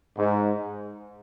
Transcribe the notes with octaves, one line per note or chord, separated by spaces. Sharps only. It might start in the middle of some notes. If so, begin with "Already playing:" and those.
G#2